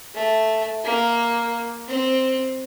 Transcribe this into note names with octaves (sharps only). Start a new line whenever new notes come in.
A3
A#3
C4